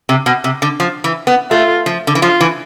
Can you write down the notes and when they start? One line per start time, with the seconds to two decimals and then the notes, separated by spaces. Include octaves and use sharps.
0.09 C3
0.26 B2
0.44 C3
0.62 D3
0.80 F3
1.04 E3
1.27 B3
1.51 A3 F4
1.86 F3
2.07 D3
2.15 E3
2.22 F3 F4
2.41 E3